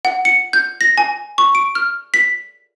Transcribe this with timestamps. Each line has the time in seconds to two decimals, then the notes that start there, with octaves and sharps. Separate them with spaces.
0.05 F#5
0.25 C#7
0.53 G6
0.81 A#6
0.98 G#5
1.38 C#6
1.55 D7
1.75 F6
2.14 B6